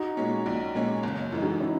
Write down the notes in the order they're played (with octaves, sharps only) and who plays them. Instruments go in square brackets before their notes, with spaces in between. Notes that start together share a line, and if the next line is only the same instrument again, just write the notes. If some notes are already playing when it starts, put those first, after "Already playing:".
Already playing: [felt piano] D#4 F#4
[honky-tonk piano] A#2 G#3 C#4
A#1
A#2 G#3 C#4
F#1
F#2 E3 G#3
[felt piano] D#4 F#4
C#4 E4